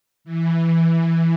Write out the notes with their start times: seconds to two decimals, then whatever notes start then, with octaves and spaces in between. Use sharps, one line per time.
0.24 E3